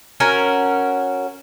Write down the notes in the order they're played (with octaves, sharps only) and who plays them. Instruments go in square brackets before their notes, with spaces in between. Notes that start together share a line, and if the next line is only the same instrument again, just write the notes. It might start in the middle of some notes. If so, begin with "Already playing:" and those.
[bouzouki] C#4 F#4 A#4